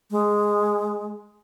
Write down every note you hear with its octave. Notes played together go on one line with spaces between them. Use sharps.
G#3